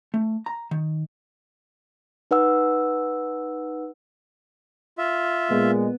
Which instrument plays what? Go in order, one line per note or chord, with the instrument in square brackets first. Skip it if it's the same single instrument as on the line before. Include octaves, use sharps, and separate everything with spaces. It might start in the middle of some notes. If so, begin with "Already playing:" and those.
[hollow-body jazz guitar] A3
A#5
D#3
[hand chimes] D#4 B4 F#5 E6
[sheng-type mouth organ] F4 E5
[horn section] A#2 G#3 [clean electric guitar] B3